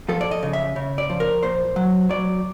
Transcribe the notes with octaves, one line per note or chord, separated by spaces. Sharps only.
F3 A4
D5
D#5
C#3
E5
C#3
D5
F3
A#4
A#2 C5
F#3
F#3 D5